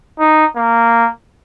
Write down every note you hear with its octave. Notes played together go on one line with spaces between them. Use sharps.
D#4
A#3